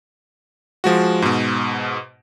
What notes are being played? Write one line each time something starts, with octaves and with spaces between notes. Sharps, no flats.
F3 G#3 F#4
G#2 B2